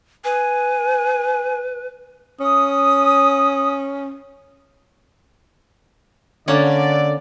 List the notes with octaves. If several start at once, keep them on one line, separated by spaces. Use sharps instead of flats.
B4 G#5
C#4 D#6
D3 A#3 C#4 D5 F#5